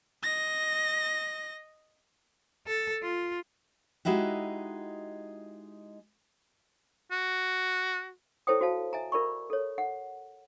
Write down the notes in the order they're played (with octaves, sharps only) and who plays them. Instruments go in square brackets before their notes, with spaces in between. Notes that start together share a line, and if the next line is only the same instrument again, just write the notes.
[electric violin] D#5 A#6
[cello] A4
F4
[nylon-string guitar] G#3 D#4 E4 F#4 G4
[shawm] F#4
[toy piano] E4 A4 C5 C#5 G5 D#6
F#4 C5 F5 A5
E5 G#5 A#5
F4 A#4 D5 B5 C#6
A4 C#5
F#5